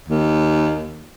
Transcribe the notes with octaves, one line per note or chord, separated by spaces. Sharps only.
D#2